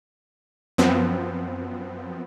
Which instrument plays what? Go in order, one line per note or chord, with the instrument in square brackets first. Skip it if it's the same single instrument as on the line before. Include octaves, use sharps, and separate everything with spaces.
[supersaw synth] F#2 F3 B3 C4